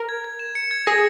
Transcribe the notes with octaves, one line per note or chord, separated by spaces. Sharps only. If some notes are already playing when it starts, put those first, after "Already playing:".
Already playing: A#4
G#6
G#6
E7
C#7
G#6
G#4 A#6